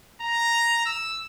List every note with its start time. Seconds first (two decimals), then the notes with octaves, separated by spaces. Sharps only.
0.22 A#5
0.86 E6